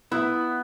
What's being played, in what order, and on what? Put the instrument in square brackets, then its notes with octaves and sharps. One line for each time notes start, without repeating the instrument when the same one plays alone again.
[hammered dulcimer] B3 [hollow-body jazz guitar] E4